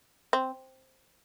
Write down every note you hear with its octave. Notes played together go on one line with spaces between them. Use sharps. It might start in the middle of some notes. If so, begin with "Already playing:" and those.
C4